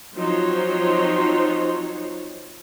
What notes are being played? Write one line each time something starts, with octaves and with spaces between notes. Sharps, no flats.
F3 F#3 C4 D#4 C5 C#5